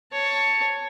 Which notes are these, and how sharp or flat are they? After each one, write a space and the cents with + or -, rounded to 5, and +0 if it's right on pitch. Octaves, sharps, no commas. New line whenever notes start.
C#5 +5 A5 +10